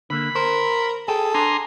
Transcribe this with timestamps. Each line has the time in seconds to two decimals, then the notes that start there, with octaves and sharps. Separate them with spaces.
0.10 D3 A#3 B5
0.35 A#4 C5
1.08 G#4 A4 G5
1.34 D4 G#5 A#5 C6